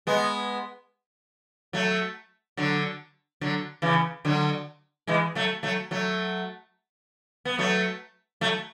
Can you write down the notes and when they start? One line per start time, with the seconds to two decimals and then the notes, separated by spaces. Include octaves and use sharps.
0.07 G#3 B3
1.73 F#3 A3
2.57 D3 F#3
3.41 D3 F#3
3.82 C#3 E3
4.25 D3 F#3
5.07 E3 G#3
5.35 F#3 A3
5.63 F#3 A3
5.91 F#3 A3
7.45 B3
7.59 F#3 A3
8.41 F#3 A3